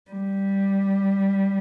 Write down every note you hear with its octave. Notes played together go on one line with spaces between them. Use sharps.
G3